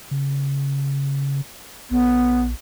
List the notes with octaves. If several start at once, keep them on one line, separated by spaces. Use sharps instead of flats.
C#3
A#1 B3